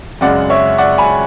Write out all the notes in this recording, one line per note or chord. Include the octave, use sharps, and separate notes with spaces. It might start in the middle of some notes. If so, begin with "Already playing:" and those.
F#2 C#3 G#3 D5 F#5
C#5 E5
D5 F#5
G#5 B5